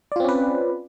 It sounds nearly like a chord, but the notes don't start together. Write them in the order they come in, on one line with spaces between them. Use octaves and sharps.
D5 F4 C4 C#4 B4